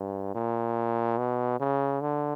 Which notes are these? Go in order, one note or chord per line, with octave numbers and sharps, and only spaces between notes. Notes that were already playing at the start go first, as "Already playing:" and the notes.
Already playing: G2
A#2
B2
C#3
D3